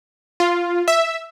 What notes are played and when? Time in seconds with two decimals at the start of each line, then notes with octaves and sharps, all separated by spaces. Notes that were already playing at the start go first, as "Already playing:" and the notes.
0.40 F4
0.88 E5